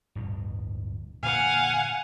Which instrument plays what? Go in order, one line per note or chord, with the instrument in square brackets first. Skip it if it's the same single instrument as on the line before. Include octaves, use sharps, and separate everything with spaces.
[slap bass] D1 G2 B2
[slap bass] A#2 D3 E3 [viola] F5 [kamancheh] F#5 G#5